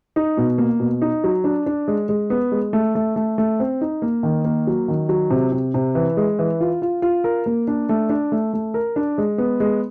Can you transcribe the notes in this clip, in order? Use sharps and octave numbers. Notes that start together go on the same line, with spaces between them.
D#4
B2
A#3
B2
D#4
F#3
D4
D4
G#3
G#3
B3
G#3
A3
A3
A3
A3
C4
D#4
A#3
D#3
A#3
F#3
D#3
F#3
C3
C3
C3
E3
G#3
E3
F4
F4
F4
A#4
A#3
D4
A3
D4
A3
A3
A#4
D4
G#3
B3
G#3